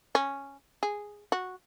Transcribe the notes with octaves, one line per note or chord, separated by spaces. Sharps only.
C#4
G#4
F#4